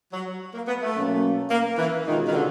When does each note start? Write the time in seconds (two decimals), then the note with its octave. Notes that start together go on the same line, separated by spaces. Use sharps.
0.13 F#3
0.54 A#3
0.68 B3
0.82 A3
0.96 B2 F#3 A#3 C#4
1.51 A#3
1.78 E3
2.06 B2 D#3 G#3 C#4 F4
2.28 D#3
2.34 D3